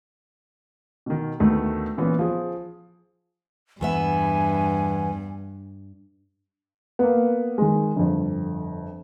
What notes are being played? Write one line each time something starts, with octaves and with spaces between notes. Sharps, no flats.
B2 D#3
D2 D#3 A3 B3
A#2 E3 B3 C#4
F3 G#4
E2 G2 B3 E5 G#5
A#3 B3
D#3 G#3
G1 F2